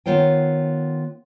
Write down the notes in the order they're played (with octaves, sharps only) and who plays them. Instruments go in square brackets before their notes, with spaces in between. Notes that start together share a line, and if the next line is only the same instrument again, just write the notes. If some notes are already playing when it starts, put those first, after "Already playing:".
[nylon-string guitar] D#3 B3 F4 C5 C#5 G5